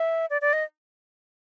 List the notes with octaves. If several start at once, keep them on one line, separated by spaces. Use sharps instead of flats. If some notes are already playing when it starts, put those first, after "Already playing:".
Already playing: E5
D5
D5
D#5